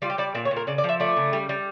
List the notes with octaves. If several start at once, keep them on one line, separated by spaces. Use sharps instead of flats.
G3 F4
G4
G3 D5
A#2 D5
C#5
A#2
A#4
C#3 D5
D5
F3
E5
A3 D5
C#3
G3
G3